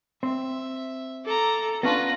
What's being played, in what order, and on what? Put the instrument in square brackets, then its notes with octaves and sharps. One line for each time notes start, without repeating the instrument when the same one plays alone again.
[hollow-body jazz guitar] C4 [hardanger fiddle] E5
[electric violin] A4 [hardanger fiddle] A#5 D6
[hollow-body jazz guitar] B3 C#4 D4 [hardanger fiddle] F4 B4 [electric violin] A#6